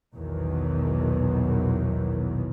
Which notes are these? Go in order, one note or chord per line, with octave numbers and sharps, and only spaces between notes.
A#1 E2 B2 D#3 E3 F#3